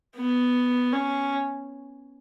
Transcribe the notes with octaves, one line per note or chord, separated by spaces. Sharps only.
B3
C#4